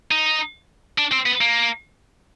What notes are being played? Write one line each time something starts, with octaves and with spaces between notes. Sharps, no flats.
D#4
D4
C4
B3
A#3